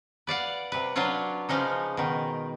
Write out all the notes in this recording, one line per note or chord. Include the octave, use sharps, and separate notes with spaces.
B4 D5 F5 F#5
C3 B4
F#3 D4 F4 B4 C#5
C#3 F3 G#3 C#4 D#4
B2 D#3